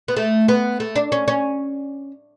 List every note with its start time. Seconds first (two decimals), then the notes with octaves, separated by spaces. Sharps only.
0.08 B3
0.17 A3
0.48 B3
0.80 A3
0.96 D4
1.12 C#4
1.28 C#4